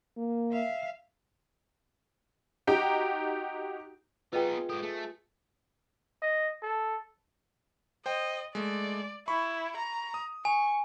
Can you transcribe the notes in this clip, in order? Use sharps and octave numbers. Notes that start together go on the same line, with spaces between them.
A#3
E5 F5
D#4 F#4 G4 G5 A#5
B3 D#4 F4 G#4 B4 D#5 G5
G#2 G4 A4
A3 G#4
D#5
A4
C5 D#5 G5
G#3 A3 D5
E4 B5 C#6
A#5
D#6
G#5 C#6